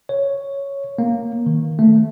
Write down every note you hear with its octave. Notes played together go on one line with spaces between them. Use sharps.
C#5
A#3
D#3
A3